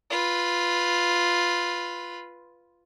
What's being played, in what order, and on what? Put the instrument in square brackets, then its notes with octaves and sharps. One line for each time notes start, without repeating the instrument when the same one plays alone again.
[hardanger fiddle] F4 B4